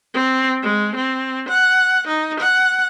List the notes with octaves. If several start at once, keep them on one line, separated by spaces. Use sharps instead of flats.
C4
G#3
C4
F#5
D#4
F#5